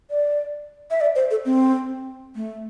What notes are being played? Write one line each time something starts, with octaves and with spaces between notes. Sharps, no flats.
D5
E5
D5
C5
A4
C4
A3